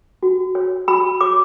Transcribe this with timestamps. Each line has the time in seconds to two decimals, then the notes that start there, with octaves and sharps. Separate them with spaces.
0.23 F#4
0.55 C#5
0.88 F#4 B5
1.21 C#5 D6